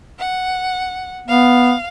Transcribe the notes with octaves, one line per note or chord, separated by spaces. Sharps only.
F#5
B3 F5